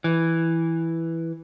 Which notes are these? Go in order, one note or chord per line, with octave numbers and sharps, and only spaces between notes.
E3